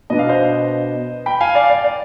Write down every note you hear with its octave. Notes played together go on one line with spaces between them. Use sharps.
B2 B3 D4 D#5
F5
C5 D#5
G5 B5
F5 G#5
D5 F5
D5
D5